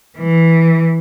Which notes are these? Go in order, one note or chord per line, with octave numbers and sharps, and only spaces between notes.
E3